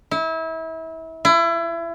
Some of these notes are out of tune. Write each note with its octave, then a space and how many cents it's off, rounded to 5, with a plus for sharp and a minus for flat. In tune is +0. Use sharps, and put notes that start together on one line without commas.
E4 -30
E4 +30